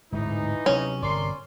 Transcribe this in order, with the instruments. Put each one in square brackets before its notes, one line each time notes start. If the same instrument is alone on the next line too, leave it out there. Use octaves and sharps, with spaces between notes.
[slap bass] D1 G#2 [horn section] E3 D#4
[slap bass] C3 F#3 [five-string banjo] C#4
[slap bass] G1 C3 [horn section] A#4 D5 C6